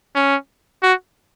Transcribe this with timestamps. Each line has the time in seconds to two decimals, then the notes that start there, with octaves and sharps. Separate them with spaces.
0.15 C#4
0.83 F#4